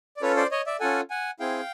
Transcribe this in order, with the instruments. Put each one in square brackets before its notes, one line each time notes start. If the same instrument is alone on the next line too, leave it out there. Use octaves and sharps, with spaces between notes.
[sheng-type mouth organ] D5
C#4 F4 A4 B4 C#5
C5 D5
C#5 D#5
D5 E5
C#4 F4 A4 F#5 G#5
F#5 G#5
C4 E4 G#4 F5 G5